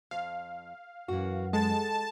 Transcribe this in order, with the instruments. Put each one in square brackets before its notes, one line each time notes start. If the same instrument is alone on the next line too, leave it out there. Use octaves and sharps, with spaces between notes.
[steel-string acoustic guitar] F2 [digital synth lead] F5
[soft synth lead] F#2 [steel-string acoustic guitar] E3 F#4
[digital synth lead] G#3 [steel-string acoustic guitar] A4 [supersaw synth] A5